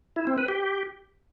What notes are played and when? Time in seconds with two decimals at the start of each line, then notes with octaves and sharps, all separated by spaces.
0.16 E4
0.27 C4
0.38 B4
0.48 G4